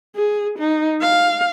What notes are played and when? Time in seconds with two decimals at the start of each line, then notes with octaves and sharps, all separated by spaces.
0.16 G#4
0.59 D#4
1.02 F5